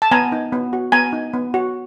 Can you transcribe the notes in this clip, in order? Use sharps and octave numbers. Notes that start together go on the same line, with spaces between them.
A5
B3 G#5 A#5
D#4
B3
F#4
B3 G#5 A#5
D#4
B3
F#4